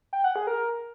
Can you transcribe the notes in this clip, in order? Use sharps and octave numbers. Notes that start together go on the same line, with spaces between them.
G5
F#5
G#4
A#4